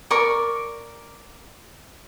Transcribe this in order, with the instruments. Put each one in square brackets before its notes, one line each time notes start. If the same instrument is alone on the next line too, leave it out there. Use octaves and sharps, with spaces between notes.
[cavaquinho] A#4 D5 C#6